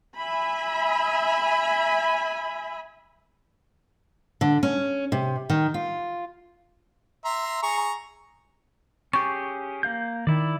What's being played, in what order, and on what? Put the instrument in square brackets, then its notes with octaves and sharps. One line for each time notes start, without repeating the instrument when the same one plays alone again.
[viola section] E5 G#5 B5
[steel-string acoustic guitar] D3
C#4
C3
D#3
F4
[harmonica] E5 A#5 C6
G#4 A#5 C#6
[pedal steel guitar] C#4 G4 G#4 [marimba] C#6
[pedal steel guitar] A#3 F5 G6
[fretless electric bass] D#3 [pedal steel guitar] E4 D5